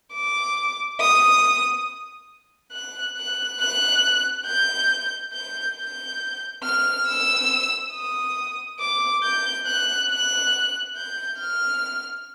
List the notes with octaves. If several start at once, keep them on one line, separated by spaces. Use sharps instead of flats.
D6
D#6
F#6
F#6
F#6
G6
G6
G6
F6
E6
D#6
D6
G6
F#6
F#6
G6
F6